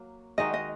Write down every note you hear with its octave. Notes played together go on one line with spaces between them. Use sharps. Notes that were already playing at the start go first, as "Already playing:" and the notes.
Already playing: F#3 A#3
D#3 G#3 D#4 F#4 D#5
D#5